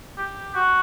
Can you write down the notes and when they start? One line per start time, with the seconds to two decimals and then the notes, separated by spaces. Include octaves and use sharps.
0.18 G4
0.55 F#4